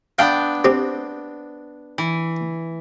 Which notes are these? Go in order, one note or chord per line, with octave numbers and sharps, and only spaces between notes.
B3 D4 F5 G5
C4 G4
E3